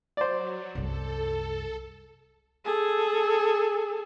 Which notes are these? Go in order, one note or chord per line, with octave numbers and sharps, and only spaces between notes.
F#3 C5 D5
C2 F#2 A4
G#4 A4